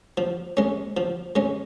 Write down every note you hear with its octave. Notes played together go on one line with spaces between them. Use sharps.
F3
G#3 C#4
F3
G#3 C#4